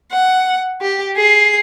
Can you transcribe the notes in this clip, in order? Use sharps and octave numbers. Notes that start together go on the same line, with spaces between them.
F#5
G4
G#4 C7